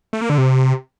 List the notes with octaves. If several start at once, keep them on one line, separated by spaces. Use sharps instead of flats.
A3
A#3
D3
C3